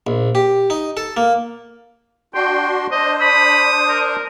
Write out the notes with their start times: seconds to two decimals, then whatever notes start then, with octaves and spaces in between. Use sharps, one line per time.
0.07 A#1
0.35 G4
0.70 D#4
0.97 A4
1.17 A#3
2.34 D4 F#4 G5 C6
2.91 D4 C5 D#5
3.21 B5 D#6
3.89 A#4